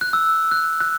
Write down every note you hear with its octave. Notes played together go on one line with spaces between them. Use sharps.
F#6
E6
F#6
F#6